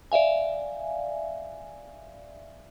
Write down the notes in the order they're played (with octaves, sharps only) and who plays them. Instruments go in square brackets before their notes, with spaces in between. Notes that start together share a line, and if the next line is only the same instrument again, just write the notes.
[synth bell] D5 E5 F5 G#5